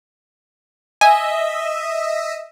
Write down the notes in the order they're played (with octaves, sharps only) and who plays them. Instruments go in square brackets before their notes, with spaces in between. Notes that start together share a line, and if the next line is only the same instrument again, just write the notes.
[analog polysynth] D#5 E5 [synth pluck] G#5